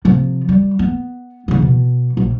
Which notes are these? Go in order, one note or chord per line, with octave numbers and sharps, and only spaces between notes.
C3 F3
G3
B3
C#3 E3
B2
A#1